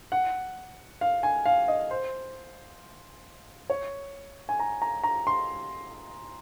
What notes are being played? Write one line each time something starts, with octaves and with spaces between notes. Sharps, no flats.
F#5
F5
G#5
F5
D#5
C5
C#5
G#5
A#5
A#5
A#5
C6